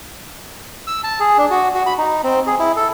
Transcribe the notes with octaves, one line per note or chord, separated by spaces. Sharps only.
E6
A5
G#4
D4
F#4
F#4
B5
D#4
C4
G#4
E4
A4